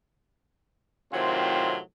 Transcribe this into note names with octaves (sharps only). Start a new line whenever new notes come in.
A2 C3 D#3 F#3 C4 F4